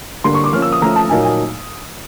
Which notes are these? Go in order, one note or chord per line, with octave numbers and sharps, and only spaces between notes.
D3 G3 A#3 C6
C#6
D6
F3 A#3 C#4 F6
E6
D#6
F3 A3 C#4 A#5
A5
A#2 F#3 A#3 D#4 G#5
G#5